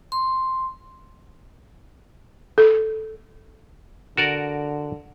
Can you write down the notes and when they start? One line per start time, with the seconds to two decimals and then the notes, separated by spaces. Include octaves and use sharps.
0.12 C6
2.58 A4
4.17 D3 F#4 A#4 D5